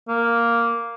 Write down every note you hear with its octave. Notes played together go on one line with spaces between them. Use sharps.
A#3